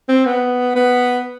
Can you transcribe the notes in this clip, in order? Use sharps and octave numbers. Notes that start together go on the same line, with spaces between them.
C4
B3
B3